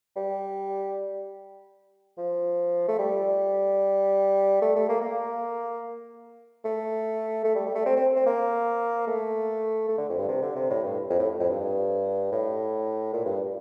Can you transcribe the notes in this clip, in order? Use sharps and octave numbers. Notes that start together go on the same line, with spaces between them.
G3
F3
A3
G3
A3
A3
A#3
A#3
A3
A3
G3
G3
A3
C4
C4
C4
A#3
A3
A3
D3
F2
G2
C3
D3
C3
A2
G2
F2
A2
F2
G2
A2
A#2
G2